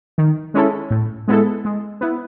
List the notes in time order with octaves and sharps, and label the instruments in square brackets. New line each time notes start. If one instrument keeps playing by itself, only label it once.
[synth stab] D#3
G#3 C#4 E4 A4
A2
G#3 B3 E4 A4
G#3
B3 E4